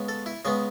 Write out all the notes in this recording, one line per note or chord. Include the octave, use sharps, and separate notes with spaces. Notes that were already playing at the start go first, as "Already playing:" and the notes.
Already playing: C#3 G#3 B3
A4
E4
C#3 G#3 B3 G#4